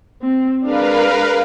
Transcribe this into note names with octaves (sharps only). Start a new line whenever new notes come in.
C4
G#3 D4 A#4 B4 F5